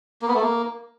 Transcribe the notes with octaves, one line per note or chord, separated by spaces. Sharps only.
A#3
B3
A3
A#3